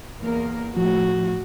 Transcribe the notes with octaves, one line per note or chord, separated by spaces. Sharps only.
E2 A#3 A#4
A2 F3 A3 F#4